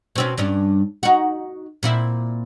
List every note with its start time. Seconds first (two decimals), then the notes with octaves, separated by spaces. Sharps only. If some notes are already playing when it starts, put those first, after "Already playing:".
0.16 B2 C4 C#4
0.38 G2 C#4 D4
1.03 D#4 F#4
1.83 A#2 C4 E4